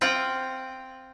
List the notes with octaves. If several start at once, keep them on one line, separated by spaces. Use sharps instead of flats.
C4 F4 F#5 G5